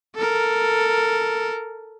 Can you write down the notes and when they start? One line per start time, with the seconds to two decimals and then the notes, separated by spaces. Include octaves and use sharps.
0.15 A4 A#4